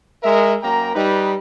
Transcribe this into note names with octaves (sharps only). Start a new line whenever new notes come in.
G#3 A#4 E5
F#2 A#3 G5 A#5
G3 D#4 B4